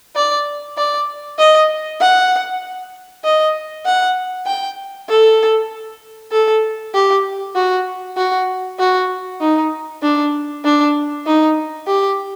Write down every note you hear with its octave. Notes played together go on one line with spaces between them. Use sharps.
D5
D5
D#5
F#5
D#5
F#5
G5
A4
A4
G4
F#4
F#4
F#4
D#4
D4
D4
D#4
G4